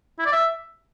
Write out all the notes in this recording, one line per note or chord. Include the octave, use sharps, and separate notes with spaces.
E4
D5
E5